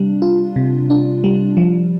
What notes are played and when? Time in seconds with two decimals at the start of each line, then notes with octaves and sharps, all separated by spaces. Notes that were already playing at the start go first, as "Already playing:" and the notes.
Already playing: C3 G3 D4
0.22 F4
0.56 C3
0.90 D4
1.24 G3
1.57 F3